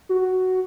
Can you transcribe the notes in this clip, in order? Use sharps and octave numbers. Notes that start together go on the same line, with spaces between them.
F#4